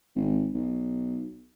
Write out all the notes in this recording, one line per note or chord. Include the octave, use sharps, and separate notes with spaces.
G#1
B1